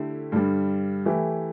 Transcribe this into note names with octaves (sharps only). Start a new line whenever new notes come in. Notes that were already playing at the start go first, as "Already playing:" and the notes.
Already playing: D3 A3 E4 G4
G2 D3 G3
E3 A3 E4 G4